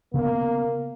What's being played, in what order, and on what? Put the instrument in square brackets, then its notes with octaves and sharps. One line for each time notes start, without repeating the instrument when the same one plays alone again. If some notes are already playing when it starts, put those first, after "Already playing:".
[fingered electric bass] C#3 B3 [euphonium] A#3